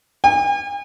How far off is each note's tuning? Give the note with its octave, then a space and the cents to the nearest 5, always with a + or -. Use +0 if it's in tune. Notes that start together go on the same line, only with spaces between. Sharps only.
G#5 -45